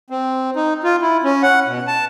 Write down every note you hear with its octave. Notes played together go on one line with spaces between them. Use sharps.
C4
D#4
F4
E4
C#4
F#5
B2
A5